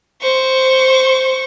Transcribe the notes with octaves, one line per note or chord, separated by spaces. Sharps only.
C5 C#6